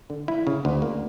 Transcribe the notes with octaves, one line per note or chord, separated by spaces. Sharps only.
D3
E4
C#3
D2
A#3